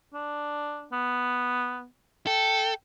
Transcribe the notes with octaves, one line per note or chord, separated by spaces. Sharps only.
D4
B3
A4 G5